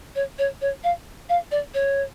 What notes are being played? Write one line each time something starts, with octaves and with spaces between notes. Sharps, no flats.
C#5
C#5
C#5
F5
F5
D5
C#5